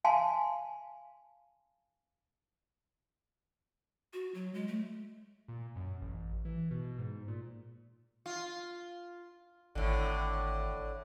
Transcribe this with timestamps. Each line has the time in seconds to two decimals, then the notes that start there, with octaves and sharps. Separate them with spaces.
0.04 F5 G#5 A5 C6
4.13 F#4
4.34 F#3
4.54 G#3
4.68 A3
5.48 A#2
5.76 F#2
6.01 A1
6.45 E3
6.71 B2
6.98 G#2
7.28 A#2
8.26 F4
9.75 G#1 A2 D3